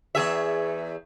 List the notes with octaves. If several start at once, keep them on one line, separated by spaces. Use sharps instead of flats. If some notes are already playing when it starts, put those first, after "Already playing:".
E2 G#4 E5